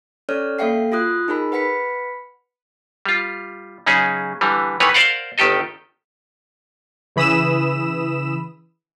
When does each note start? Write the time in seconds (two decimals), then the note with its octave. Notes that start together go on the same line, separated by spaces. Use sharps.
0.29 C#4 A4 C#5 D5 F6
0.59 A#3 A4 E5 F5 G5 C7
0.92 F4 F#4 D#6 F#6
1.28 D#4 G#4 A#4 B5
1.52 B4 F#5 B5 B6 C#7
3.06 G3 F4
3.86 C#3 F#3 C#4 D#4 G#4
4.41 D3 E3 G3
4.80 D#3 E3 A3 B4 C#5
4.94 A#4 C5 D5 F5 F#5
5.38 G1 D#3 G4 A4 D#5
7.16 C#3 E3 B5 D#6 E6 E7